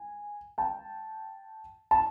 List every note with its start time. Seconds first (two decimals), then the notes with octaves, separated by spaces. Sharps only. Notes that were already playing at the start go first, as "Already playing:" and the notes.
Already playing: G#5
0.58 G5 A5
1.91 A5